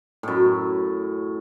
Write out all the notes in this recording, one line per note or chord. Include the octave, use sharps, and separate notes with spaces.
F#2 A2